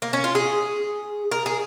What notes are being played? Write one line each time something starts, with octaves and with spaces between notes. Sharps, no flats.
A#3
C#4
F4
G#4
A#4
G#4